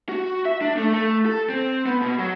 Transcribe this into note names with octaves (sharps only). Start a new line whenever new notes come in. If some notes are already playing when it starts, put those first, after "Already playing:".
F#4
E5
D4
A3
A3
A4
C4
B3
B2
F#3